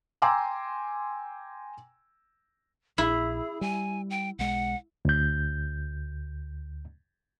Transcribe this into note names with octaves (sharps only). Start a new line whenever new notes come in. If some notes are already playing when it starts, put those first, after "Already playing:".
G5 G#5 A#5 C6 D6 E6
A#1 E4 G#4
G3 G#5
G5
B1 G#3 F#5
D2 G6